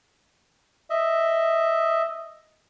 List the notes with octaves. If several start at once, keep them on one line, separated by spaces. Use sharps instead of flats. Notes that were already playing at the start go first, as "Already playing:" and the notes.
D#5 E5